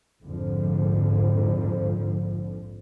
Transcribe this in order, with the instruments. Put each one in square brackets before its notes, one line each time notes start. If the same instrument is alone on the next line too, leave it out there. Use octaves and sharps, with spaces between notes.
[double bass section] A#1 F2 G#2 D3 F3